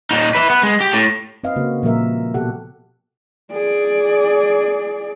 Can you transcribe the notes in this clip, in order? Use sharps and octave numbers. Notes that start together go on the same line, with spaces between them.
A#2 D#4
B4 E5
B3
G#3
G4
A2
C4 B4 D#5 F5
C#3 A#3 F#4
A#2 F3 G3 A#3 A#4 E5
B2 F#4 G4 A4 F#5
G#4 D5